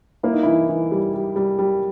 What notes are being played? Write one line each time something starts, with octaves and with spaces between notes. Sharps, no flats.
A#3 E4
D#4
E3 E4
E3
G3
G3
G3
G3